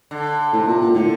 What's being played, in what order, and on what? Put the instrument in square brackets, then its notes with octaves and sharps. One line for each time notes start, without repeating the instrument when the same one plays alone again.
[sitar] D3
[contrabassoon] A2 [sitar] C3
[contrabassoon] A#2
A#2
[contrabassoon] A2 [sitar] D3